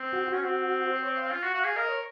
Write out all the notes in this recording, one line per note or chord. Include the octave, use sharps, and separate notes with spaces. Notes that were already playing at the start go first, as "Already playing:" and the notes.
Already playing: C4
F#4
F#4
C#4
C4
C5
C#5
F5
F4
F#4
F#4 F5
G#4
A#4 D#5
C#5